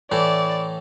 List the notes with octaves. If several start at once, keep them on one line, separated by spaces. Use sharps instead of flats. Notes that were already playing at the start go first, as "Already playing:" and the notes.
A2 E3 A3 E4 D5